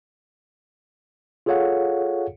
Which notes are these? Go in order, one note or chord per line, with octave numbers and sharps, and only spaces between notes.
F4 G#4 A4 C#5 F5 F#5